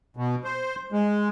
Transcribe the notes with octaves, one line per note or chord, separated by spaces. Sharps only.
B2
C5
G#3